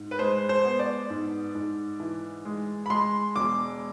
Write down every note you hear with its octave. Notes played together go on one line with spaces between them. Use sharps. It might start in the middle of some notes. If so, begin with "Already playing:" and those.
Already playing: G#2
B4
G#3 C5
C5
B3
D5
G#2
G#2
E3
G#3
B5
G#3 C6
E1 D6